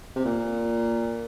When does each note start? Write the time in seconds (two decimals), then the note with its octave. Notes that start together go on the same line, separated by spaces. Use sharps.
0.16 C3
0.25 A#2